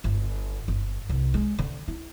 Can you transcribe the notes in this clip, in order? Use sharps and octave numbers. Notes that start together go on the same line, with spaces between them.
G1
G1
C2
G#3
D3
E4